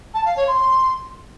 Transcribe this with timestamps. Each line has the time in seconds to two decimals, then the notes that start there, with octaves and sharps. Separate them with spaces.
0.13 A5
0.25 F5
0.36 C#5
0.47 C6